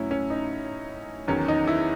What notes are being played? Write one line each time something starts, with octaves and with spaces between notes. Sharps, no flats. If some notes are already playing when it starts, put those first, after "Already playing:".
Already playing: A2 F#3 C#4 E4
C#4
D#4
E2 D#3 F#3 C#4
D#4
E4